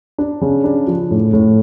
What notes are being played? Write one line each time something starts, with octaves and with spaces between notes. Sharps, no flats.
D4
C#3
D4
F3
A2
A2